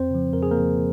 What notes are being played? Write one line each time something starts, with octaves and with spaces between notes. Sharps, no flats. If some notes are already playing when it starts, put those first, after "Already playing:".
Already playing: F2 C4 C5
C#3 F3
F2 A#4
G#4
A#3 A#4
C#3 F3